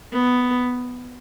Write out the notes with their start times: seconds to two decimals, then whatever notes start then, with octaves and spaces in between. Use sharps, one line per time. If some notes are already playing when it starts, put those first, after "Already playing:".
0.13 B3